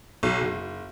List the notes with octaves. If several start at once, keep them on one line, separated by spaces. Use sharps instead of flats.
B1
F#1